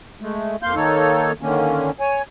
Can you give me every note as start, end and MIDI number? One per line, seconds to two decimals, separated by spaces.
0.21 0.56 56
0.21 0.56 57
0.63 0.75 41
0.63 0.75 58
0.63 0.75 77
0.63 0.75 84
0.63 0.75 91
0.75 1.32 51
0.75 1.32 58
0.75 1.32 63
0.75 1.32 69
0.75 1.32 73
1.42 1.90 50
1.42 1.90 51
1.42 1.90 58
1.42 1.90 61
2.00 2.22 73
2.00 2.22 80